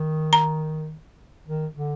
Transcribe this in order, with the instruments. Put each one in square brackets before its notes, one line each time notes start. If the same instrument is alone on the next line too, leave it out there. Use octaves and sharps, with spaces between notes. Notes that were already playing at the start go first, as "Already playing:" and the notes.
Already playing: [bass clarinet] D#3
[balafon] A#5
[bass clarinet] D#3
D3